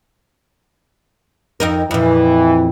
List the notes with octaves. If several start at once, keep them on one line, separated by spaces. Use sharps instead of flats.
F2 D#4 A#4
F2 A#2 E3